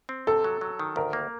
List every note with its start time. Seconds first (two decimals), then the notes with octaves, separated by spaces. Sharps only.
0.09 C4
0.27 C3 A4
0.44 F#3
0.61 F#3
0.79 D#3
0.96 D2 A#4
1.13 A#3